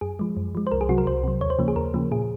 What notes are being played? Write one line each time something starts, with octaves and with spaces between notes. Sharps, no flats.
F#2 G#4
F3 G#3
F#2
F3 G#3
C5
C2 A#4
G#4
C3 F#3 F#4
A#4
C2 C5
C3 F#3
D#2 C#5
C5
C#3 F3 A#3
G#4
D#2 A#4
C#3 F3 A#3
A#2 G#4